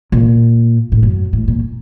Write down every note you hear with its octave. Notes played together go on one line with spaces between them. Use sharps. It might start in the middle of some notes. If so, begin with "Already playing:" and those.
A#2
A2
F#2
A2
A#2